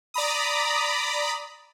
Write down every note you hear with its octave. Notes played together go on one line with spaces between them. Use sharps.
D5 A#5 B5 D#6